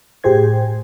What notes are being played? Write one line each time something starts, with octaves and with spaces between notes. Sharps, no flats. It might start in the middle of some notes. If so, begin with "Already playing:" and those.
A2 G4 G#4 C5 G#6